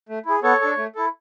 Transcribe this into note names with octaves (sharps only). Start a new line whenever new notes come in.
A3
E4 G#4
B3 A4 C#5
D4 A4
A3
E4 A4